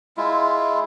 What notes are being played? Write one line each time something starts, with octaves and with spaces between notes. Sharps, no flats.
G#3 E4 F4